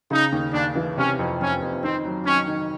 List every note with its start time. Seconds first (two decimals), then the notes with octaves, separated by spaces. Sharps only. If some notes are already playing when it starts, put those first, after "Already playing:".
0.11 C#3 D#4
0.32 D#2
0.54 D#2 D4
0.75 E3
0.97 C3 C#4
1.19 F2
1.41 F2 C#4
1.62 F2
1.84 D#3 C4
2.05 F#3
2.26 D#3 C#4
2.47 D#3